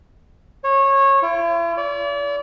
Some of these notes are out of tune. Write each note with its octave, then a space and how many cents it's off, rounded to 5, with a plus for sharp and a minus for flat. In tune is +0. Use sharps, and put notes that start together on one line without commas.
C#5 -20
E4 +45
D5 -40